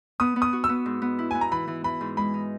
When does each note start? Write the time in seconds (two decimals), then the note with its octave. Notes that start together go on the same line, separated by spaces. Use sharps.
0.20 B3 D#6
0.36 B3
0.42 D#6
0.53 F#4
0.64 E6
0.69 B3
0.86 G#2
1.02 B3
1.19 E4
1.31 B3 G#5
1.41 A#5
1.51 E3 B5
1.68 E3
1.84 E3 B5
2.01 G#2
2.17 G#3 B5
2.34 D#4